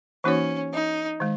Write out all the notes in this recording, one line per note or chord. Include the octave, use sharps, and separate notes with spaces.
E3 A#3 C#4 D#4 F#4 C#5
D#4
D#3 G#3